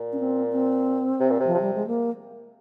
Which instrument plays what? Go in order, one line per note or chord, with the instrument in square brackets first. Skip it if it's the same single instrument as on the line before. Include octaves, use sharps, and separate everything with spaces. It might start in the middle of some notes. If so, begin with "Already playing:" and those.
Already playing: [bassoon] A#2
[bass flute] C#4
C4
C4
[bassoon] C3
A#2
C3
[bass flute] F3
[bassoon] C3
[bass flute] G3
G#3
A#3